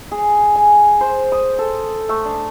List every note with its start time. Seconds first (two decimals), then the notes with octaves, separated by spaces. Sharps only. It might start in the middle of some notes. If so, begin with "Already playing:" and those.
0.12 G#4
0.56 G#5
1.01 C5
1.32 D#6
1.59 A4
2.09 A3
2.25 D4